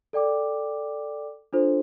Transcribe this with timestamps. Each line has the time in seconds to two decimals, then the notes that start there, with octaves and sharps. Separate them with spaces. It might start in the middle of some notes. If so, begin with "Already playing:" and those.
0.13 A4 D5 G5 D6
1.53 D4 F4 A4 C5